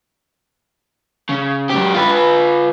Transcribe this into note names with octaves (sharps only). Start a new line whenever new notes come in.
C#3
F#2 G4
F4 B4